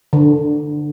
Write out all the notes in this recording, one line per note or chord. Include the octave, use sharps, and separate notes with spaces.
D3